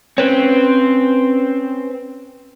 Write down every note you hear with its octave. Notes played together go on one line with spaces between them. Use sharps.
C4 C#4 B4 C#5